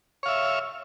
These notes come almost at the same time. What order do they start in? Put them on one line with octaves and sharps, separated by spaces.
C#5 F5 E5